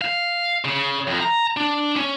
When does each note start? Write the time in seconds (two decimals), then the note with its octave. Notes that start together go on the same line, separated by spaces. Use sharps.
0.01 F5
0.65 C#3
1.07 F2
1.21 A#5
1.57 D4
1.96 C#4